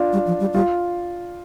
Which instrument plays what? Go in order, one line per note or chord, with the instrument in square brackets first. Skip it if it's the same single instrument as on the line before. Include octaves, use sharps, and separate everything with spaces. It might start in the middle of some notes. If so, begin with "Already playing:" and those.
Already playing: [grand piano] D4 F4
[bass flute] G3
F3
G3
[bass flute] G3 [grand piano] F4